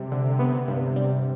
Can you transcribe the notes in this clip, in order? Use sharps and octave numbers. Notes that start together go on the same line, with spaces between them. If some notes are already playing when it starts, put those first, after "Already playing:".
Already playing: C3 G3
D3
B3
G2
G3